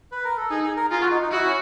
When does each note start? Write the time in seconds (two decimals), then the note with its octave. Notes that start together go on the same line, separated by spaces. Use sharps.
0.12 B4
0.24 A#4
0.37 A4
0.50 D#4 G#4
0.63 G#4
0.77 A#4
0.91 F4 G#4
1.01 F#4
1.11 D#4
1.22 D#4
1.31 E4 F#4
1.45 C#4